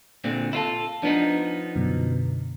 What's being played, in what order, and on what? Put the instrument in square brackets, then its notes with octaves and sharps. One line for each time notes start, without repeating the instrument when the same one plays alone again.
[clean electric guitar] A#2 D3 C4
E4 F4 A4
[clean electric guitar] F3 B3 D#4 [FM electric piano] D4
[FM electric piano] F#2 B2 D3